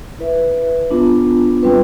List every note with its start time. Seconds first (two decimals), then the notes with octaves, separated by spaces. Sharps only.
0.19 E4 B4 E5
0.90 B3 D4 F4
1.63 G3 C4 F4 B4